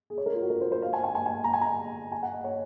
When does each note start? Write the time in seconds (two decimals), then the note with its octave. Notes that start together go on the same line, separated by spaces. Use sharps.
0.10 G#4
0.18 C#5
0.26 A#4
0.34 F4
0.42 F#4
0.50 A#4
0.61 C5
0.72 C5
0.82 F5
0.93 G#5
1.04 G#5
1.15 G#5
1.26 G#5
1.44 A#5
1.53 G#5
1.61 A#5
2.12 G#5
2.23 F#5
2.33 D#5
2.44 C#5